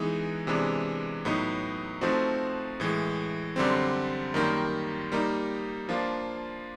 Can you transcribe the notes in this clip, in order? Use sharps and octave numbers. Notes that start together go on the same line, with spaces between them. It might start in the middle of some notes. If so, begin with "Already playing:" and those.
Already playing: E3 G#3 B3 D#4 G#4
C3 E3 G#3 B3 D4
A2 F#3 B3 D#4
F3 A3 C4 D#4 F#4
A2 E3 G#3
F#2 D3 G3 C4
F#2 D#3 G3 A#3
G3 A#3 D#4
F3 A#3 D4 F4